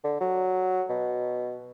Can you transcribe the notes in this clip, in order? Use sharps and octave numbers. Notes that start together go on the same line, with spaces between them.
D3
F#3
B2